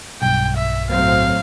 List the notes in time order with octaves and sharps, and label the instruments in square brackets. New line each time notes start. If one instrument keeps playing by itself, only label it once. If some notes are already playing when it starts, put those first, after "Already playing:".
[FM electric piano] B1 G2 [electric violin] G5
[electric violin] E5
[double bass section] A2 F#3 C4 [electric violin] F5